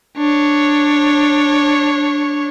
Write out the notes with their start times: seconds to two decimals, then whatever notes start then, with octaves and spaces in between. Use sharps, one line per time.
0.17 D4 C#5